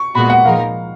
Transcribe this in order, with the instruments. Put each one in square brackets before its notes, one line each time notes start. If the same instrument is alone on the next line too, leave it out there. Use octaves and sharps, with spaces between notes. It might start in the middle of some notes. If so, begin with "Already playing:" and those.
Already playing: [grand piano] C#6
[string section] A#2 G#3 B3 F#4 [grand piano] B5
[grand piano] F#5
[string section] A#2 F3 G#3 D#4 A#4 [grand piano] F5